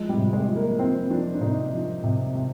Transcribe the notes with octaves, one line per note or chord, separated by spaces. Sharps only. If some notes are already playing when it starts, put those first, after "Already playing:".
Already playing: F3 G#3
G3
C3
G#3
F3
A#3
F3 C4
F3 D4
D4
C3 D#4
F3
C3
C3